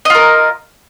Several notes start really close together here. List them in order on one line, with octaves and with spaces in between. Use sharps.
D#5 F4 A#4